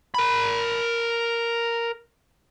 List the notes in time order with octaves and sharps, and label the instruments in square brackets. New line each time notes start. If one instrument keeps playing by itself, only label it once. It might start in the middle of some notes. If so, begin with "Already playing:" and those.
[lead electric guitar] A#4 B5